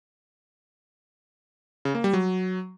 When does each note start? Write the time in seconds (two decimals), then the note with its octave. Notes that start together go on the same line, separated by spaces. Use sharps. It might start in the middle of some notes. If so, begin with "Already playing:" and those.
1.85 C#3
1.95 A#3
2.04 G3
2.13 F#3